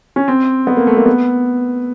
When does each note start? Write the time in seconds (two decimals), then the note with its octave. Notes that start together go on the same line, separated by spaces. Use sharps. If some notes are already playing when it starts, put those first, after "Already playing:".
0.16 C#4
0.28 C4
0.67 B3
0.77 A#3
0.87 A3
0.97 A#3
1.06 B3